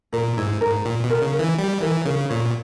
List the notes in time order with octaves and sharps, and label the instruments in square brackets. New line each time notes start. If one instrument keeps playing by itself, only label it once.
[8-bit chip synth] A#2 [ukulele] A#4
[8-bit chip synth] G#2 [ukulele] E4
[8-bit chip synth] G#2 [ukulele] A#4
[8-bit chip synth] A#2 [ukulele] G5
[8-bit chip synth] B2
[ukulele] A#4
[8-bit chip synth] C#3
[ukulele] A#4
[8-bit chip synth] E3
[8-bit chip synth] G3 [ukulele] G5
[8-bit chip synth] E3 [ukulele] A#4
[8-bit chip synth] C#3 [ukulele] A#4
[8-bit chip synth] A#2 [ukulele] C#5